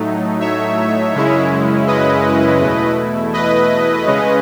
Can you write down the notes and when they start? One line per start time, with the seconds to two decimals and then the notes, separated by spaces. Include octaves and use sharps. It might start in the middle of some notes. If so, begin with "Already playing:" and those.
Already playing: A2 F#3 A3 D#4
0.40 C#5 E5
1.14 F#2 C#3 G#3 C#4 E4
1.87 B4 D#5
2.60 E2 B2 A3 E4
3.33 B4 D#5
4.06 C#3 G#3 C#4